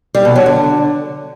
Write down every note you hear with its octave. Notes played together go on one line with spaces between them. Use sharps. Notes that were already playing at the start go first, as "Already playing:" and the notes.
G3
B2
F#3
D3